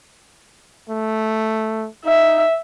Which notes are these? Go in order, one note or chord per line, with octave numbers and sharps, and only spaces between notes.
A3
D#4 E5